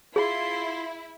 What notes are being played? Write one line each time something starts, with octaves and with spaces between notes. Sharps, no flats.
E4 F4 G#4 C6